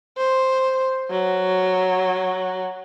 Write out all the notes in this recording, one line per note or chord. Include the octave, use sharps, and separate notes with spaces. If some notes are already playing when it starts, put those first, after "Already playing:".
C5
F#3